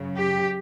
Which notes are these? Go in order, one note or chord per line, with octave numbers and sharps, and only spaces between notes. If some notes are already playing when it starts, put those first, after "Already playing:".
Already playing: F#2 C#3 F#3
G4